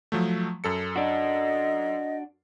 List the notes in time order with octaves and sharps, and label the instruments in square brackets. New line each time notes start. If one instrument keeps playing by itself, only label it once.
[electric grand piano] F3 F#3 A3
F#2 A4 C#7
[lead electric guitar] D4 F#4 [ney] D#5